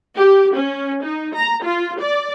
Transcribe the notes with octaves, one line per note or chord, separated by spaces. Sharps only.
G4
C#4
D#4
A#5
F4
D5